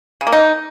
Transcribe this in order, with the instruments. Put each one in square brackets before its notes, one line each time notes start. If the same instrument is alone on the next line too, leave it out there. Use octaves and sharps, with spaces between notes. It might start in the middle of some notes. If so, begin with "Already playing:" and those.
[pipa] C#3
A#3
D#4